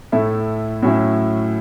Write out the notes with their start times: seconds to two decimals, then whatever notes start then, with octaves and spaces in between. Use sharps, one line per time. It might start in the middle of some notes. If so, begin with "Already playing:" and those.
0.12 A2 A3 E4
0.83 A2 F#3 C#4 E4 E5